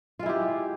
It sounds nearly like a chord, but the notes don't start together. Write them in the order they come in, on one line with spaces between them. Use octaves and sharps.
F4 G#3 E4 G4